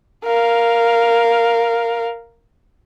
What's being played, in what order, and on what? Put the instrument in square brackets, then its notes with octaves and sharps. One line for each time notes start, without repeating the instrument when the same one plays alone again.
[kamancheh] A#4 F5